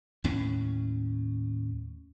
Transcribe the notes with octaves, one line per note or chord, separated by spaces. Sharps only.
D#2 A2 C#4